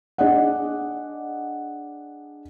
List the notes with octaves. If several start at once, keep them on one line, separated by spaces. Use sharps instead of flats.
D4 G#4 D5 D#5 F#5